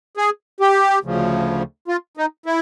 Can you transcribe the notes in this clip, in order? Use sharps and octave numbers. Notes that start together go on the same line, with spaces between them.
G#4
G4
D2 C#3 F3
F4
D#4
E4